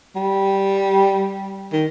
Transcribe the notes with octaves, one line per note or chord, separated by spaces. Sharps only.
G3
D#3